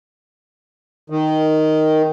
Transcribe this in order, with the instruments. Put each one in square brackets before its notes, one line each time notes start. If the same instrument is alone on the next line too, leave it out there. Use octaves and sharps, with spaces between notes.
[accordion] D#3